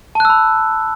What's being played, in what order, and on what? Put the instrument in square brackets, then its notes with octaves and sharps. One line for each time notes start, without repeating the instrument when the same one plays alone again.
[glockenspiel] A5
F#6
E6
B5